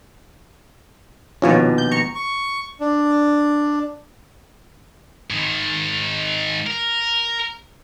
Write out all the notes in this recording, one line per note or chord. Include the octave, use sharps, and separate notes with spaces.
A#1 D#2 B2 C#4 F4 C#5
G6
A#5 C#6 C#7
C#6
D4
G#2 D#3
A#4